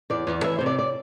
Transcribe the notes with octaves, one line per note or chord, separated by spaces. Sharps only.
E2 D5
E2
E3 E5
C3 C5
D5
D5